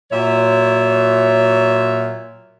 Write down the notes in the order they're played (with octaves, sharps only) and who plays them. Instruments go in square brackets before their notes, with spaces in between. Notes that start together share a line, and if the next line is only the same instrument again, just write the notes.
[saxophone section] A#2 F#3 C#5 E5